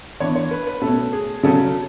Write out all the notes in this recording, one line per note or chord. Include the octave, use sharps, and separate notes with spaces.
E3 B3 D4 C#5
C#5
B4
B4
B2 A3 C#4 A4
G#4
C#3 F#3 C#4 A4